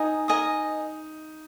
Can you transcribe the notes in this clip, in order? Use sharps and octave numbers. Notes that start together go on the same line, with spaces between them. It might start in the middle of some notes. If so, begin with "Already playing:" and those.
Already playing: D#4 A#4 D#5 G#5
A#4 D#5 G#5 D#6